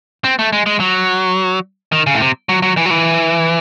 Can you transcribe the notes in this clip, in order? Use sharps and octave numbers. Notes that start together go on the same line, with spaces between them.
C4
A3
G#3
G#3
F#3
D#3
C#3
A2
C3
F#3
F#3
E3
F#3
E3